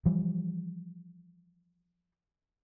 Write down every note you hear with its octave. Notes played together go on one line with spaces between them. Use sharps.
E3 F3 G3